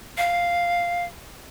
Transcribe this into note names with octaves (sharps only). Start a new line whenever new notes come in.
F5